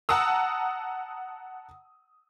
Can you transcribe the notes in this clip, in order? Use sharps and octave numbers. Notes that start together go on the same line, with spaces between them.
F#5 A5 A#5 D#6 E6